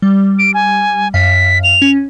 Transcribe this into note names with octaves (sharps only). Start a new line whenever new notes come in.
G3
D7
G#5
F#2 F5 B6
F7
C#4